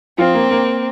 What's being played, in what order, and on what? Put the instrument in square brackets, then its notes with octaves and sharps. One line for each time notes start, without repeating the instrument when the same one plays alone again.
[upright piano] F3 F4 [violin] C4
[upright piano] A#3
A#3